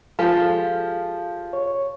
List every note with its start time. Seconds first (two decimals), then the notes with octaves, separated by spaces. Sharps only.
0.19 F3 G#3 G4 A4 F5
1.53 C#5